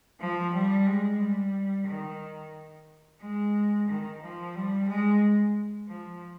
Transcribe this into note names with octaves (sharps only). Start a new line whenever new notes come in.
F3
G3
G#3
G3
D#3
G#3
D#3
F3
G3
G#3
F3